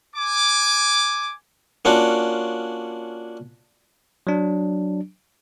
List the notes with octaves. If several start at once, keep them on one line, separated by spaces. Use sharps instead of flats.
G#5 D6
A#3 C#4 D4 F4 F#4
F#3 D4